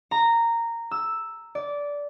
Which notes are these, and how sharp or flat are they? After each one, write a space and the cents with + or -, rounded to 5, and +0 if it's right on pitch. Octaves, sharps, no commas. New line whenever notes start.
A#5 -10
E6 +0
D5 -15